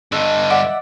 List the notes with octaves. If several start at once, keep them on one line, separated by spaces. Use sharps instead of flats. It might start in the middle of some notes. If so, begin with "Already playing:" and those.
G2 D3 A4 D#5
D5 E5 F#5